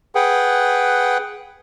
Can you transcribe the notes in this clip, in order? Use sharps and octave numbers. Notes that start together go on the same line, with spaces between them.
G#4 B4 F#5 G5